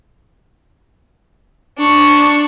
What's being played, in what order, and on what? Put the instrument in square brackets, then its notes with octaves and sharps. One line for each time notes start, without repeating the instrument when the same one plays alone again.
[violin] D4 C#6